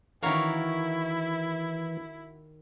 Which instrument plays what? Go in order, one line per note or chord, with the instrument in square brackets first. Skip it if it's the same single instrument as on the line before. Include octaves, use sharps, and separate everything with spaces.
[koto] D#3 F#4 [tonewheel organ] E3 [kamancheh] E4 [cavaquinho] A#4 C#5 F5